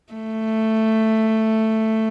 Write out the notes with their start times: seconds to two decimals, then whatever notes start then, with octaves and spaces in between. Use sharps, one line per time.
0.13 A3